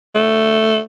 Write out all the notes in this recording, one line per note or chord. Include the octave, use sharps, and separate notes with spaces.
A3